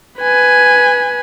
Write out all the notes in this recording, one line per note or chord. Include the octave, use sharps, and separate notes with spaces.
B4 G#5